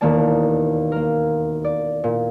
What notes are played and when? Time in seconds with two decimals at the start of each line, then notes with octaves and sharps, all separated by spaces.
0.01 E1 D#2 D#3 A#3 D5 A5
0.92 A#3 A#4
1.65 D5
2.04 A#2